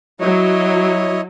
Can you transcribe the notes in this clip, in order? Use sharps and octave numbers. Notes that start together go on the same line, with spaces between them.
F#3 E4 C#5 D#5